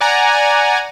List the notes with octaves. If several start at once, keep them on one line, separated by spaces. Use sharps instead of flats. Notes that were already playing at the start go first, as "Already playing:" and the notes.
D5 F#5 G#5 A#5